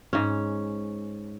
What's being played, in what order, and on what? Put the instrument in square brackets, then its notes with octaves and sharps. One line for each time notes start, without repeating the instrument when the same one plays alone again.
[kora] G#2 C#4